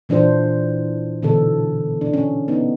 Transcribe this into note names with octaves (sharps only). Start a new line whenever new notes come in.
A#2 E3 D4 F4 C5
B2 D3 E3 A4
D4
C#4
B3 D#4